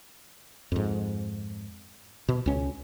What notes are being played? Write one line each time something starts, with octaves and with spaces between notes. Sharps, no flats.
F2 G#2
B2
C#2 C#4